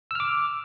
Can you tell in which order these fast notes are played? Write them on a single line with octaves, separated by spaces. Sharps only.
E6 F6 D6